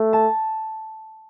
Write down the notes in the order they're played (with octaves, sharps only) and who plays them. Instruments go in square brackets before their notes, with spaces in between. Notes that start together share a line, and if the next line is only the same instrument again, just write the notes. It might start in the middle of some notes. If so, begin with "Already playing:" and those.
Already playing: [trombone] A3
[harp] A5